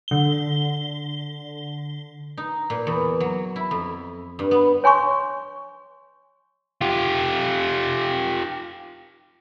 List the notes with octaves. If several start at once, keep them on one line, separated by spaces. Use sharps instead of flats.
D3 G7
D#4
A#2
E2
F#3
E4
F2
G2
B3
C#5 G#5 C6 C#6
F4 G4